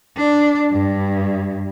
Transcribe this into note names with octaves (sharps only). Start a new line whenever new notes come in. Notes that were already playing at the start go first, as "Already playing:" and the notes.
D4
G2